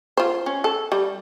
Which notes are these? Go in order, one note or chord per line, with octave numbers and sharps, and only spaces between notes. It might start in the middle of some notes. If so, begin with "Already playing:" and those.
F4 C5
C#4
A4
G3